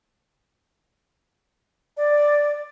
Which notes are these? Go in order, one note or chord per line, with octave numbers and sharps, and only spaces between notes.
D5